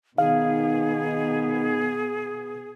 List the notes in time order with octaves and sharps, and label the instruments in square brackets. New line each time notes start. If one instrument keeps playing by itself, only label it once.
[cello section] B2 B3 [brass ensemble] D#3 D#4 [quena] G#4 [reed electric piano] F5